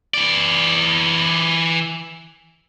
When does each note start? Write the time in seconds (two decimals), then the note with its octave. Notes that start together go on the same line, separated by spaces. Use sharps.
0.14 E3 D5